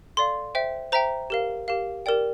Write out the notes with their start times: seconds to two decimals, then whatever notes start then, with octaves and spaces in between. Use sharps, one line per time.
0.17 A4 D5 F5 C6
0.55 C5 E5 G5
0.92 C5 E5 G5 A#5
1.30 G4 A#4 F5
1.68 G4 A#4 F5
2.06 G4 A#4 D5 G5